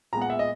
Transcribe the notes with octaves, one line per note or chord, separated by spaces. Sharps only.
A#2 G#3 B3 A#5
F#5
E5
D#5